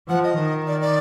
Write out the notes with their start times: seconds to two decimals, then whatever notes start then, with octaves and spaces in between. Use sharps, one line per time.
0.09 F3 F#5
0.24 D#5
0.39 D#3
0.67 D5
0.81 D5